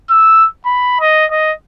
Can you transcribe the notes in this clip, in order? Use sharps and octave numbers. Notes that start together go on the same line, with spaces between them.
E6
B5
D#5
D#5